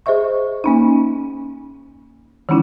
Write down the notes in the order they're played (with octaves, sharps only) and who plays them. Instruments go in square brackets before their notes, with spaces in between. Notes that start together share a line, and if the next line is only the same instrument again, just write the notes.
[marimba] G#4 C5 D#5 E5 C#6
A#3 C#4 D#4
D#3 E3 G#3 C#4 D#4 E4